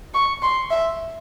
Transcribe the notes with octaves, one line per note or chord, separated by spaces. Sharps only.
C#6
C6
E5